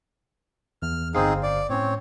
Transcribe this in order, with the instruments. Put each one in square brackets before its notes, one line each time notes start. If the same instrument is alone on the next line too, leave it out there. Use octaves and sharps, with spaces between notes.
[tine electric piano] E2 [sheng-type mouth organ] F6
[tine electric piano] G1 C5 F5 [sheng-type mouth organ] C4 D#4 G#4
[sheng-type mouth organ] D5
[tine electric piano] A2 C#4 [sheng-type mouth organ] C4 C#5